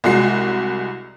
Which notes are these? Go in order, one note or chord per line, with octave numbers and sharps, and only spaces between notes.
C2 G#3 F#4 C7